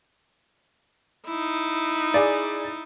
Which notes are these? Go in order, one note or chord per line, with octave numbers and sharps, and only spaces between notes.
D#4 E4
G#4 D5